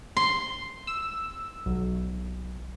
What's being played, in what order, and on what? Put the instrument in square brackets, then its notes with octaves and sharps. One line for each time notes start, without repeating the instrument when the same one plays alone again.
[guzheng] C6
[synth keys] E6
B1